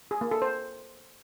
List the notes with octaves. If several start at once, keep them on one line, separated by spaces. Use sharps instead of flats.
G#4
A#3
A4
C5